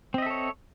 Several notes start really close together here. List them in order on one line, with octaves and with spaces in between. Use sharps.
C4 D#5 E5 A4 C#5